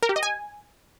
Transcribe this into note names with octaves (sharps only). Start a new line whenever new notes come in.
A#4
G4
D#5
G#5